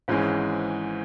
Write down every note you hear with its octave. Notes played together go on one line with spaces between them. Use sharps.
G#1 G#2 E3 G#3 C#4